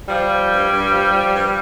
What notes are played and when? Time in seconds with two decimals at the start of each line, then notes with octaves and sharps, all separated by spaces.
0.09 F3 G3
0.29 F3
0.50 G2
0.71 G2
0.91 F3
1.12 F3
1.33 G2